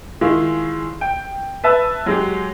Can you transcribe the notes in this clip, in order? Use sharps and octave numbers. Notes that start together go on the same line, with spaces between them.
D#3 G#3 E4 F4
G5
B4 E5 A5
F#3 G#3 G4